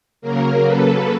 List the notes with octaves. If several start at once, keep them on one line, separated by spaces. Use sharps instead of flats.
C#3 F#3 A#3 A#4
A4 B4